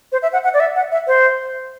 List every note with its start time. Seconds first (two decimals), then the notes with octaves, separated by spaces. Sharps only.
0.12 C5
0.23 E5
0.33 F#5
0.44 F#5
0.54 D5
0.60 E5
0.76 F#5
0.92 E5
1.07 C5